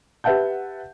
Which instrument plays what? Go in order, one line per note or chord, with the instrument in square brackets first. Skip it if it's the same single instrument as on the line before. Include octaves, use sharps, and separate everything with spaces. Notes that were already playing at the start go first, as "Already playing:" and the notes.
[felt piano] G4 B4 E5 F#5 A5 G6